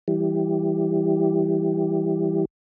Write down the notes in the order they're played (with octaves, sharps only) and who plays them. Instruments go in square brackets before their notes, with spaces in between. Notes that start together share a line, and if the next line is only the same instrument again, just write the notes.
[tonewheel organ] E3 G3